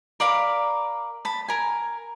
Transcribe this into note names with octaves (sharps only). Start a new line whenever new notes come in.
A#4 D5 F5 B5
A5 B5
A#4 G#5